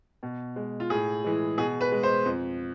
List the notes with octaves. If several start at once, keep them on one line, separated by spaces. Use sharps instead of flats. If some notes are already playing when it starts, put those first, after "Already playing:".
B2
G#3
F4
A2 G#4
E3 G#3
B2 G#4
B4
G#3
C5
F2